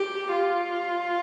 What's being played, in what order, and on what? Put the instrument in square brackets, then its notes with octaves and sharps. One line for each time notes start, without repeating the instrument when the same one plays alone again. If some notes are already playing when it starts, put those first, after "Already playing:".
Already playing: [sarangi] G4
F4